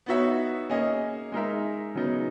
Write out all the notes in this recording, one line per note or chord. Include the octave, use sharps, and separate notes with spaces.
B3 D#4 F#4 C#5 E5
A#3 C#4 G#4 D#5
G#3 D#4 A#4 E5
C#3 F#3 B3 D#4